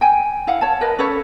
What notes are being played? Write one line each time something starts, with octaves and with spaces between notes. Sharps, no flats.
G5 G#5
E4 F5 F#5
C#5 A5
A#4 B4 D#5
C#4 A4 B4 C#5